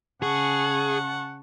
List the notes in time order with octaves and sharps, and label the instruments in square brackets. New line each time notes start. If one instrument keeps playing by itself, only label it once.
[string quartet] C#3 A5 C#6 [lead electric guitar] G#4 [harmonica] F#5